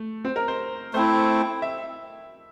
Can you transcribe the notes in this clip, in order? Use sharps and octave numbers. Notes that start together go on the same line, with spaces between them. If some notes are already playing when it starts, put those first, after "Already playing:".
Already playing: A3
C4
A#4
C5
A3 C4 E4 C5
E5